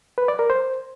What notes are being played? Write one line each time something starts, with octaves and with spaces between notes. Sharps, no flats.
B4
D5
A#4
C5